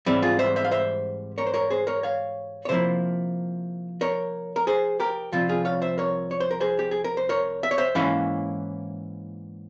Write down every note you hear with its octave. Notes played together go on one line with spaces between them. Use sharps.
G#2 E3 G3 C4 E4
F4 G#4
C5 E5
C5 E5
F5
C5 E5
A#4 C#5
C5
A#4 C#5
G#4 C5
A#4 C#5
C#5 F5
C#5
C3 F3 A#3 E4 C5 E5
A#4 C#5
A#4
G#4 C5
G4 A#4
C2 C3 F3 F4
F4 G#4
C#5 F5
C5 E5
A#4 C#5
C#5
C5
A#4
G#4 C5
G4
G#4
A#4
C5
A#4 C#5
E5
C#5
C5 E5
G#2 E3 A#3 C#4 E4 C#5 F5